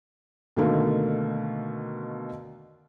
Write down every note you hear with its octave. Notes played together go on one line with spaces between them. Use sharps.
B2 D3 D#3 A3 A#3